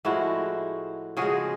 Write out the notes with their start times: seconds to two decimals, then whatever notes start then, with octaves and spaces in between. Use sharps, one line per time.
0.05 A2 F3 G#3 E4 F#4
1.17 C#3 F3 G#3 F#4 G#4